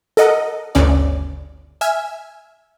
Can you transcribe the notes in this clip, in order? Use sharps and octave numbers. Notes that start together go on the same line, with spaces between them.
A4 A#4 D#5 F#5
G1 D2 C#3 C#4 D5
E5 G#5 F6